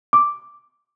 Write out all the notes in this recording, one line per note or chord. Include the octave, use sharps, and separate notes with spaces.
D6